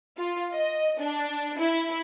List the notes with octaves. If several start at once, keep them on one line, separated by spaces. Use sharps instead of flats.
F4
D#5
D4
E4